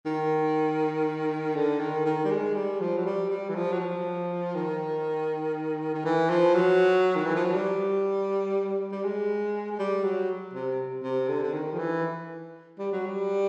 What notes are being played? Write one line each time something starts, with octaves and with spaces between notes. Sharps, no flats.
D#3
D3
D#3
D#3
G3
G#3
G3
F3
F#3
G3
G3
E3
F3
F#3
F3
D#3
D#3
E3
F3
F#3
D#3
E3
F3
F#3
G3
G3
G#3
G#3
G3
F#3
C3
C3
D3
D3
D#3
F3
E3
G3
F#3
G3